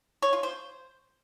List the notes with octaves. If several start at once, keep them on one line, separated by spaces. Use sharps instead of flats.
C#5
F4
C5